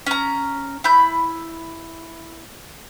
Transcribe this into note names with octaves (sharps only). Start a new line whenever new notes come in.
C#4 A#5
E4 B5 G6